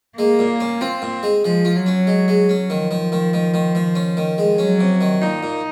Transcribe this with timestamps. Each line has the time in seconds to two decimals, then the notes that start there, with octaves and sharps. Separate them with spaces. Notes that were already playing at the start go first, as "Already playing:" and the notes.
0.18 G#3 A#3
0.39 A#2
0.60 C#4
0.81 C4 F4
1.02 A#2
1.23 G#3
1.44 F3 G#3
1.65 F4
1.76 F#3
1.86 C#4
2.07 G#3
2.28 G#3
2.49 C#4
2.70 D#3 F3
2.91 D#3
3.12 D#3
3.33 D#3
3.54 D#3
3.75 D#3
3.95 C#4
4.17 D#3
4.38 G#3
4.58 F#3 C#4
4.79 C3
5.01 D#3
5.22 A#2 D#4
5.43 A#2